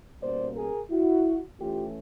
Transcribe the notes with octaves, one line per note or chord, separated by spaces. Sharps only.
B2 G3 A#3 C#4 C5 D5
G#4 A#4
E4 F#4
E3 A3 C#4 F4 G4